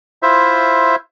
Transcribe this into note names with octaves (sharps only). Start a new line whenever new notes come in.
E4 F4 C5 E5